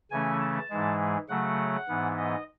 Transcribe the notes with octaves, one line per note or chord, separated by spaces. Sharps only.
C#3 E3 A3 C#4 G#5
A5
G#2 E3 G#3
C#3 F#3 A3 F#5
G#2 E3 B3
D#5